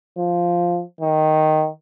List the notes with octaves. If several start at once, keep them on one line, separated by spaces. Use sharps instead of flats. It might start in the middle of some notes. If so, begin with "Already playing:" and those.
F3
D#3